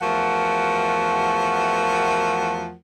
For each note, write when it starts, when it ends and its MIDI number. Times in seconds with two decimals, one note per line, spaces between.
0.02 2.73 40
0.02 2.73 53
0.02 2.73 57
0.02 2.73 66
0.02 2.73 70
0.02 2.73 78